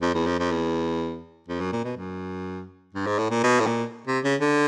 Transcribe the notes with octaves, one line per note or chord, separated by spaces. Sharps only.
F2
E2
F2
F2
E2
F2
F#2
A#2
B2
F#2
G2
G#2
A2
A#2
B2
A2
A#2
C3
C#3
D3